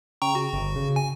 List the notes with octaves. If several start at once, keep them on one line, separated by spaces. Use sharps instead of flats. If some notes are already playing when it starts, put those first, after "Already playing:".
C#3 G5 A#5 C#6
F#4
G1
C#3
G#5